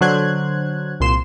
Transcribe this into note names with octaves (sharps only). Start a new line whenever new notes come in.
D3 F#3 C5 F#6 G#6
C2 A#2 C6 E7